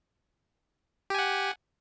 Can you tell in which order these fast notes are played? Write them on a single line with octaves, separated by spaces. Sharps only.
G4 G#5 F#5